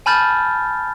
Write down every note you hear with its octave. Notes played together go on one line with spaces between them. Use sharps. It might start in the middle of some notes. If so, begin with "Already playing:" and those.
G#5 A5 B5 F6 G6 A6